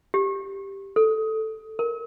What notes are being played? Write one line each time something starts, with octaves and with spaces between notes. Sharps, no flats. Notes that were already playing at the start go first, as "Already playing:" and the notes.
G4
A4
A#4